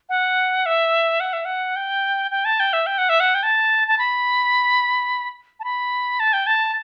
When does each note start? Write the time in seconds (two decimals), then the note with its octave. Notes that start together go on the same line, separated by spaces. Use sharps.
0.09 F#5
0.66 E5
1.20 F#5
1.33 E5
1.45 F#5
1.76 G5
2.31 G5
2.45 A5
2.60 G5
2.73 E5
2.87 G5
2.98 F#5
3.09 E5
3.20 F#5
3.35 G5
3.43 A5
3.88 A5
3.99 B5
5.60 A5
5.64 B5
6.20 A5
6.33 G5
6.47 A5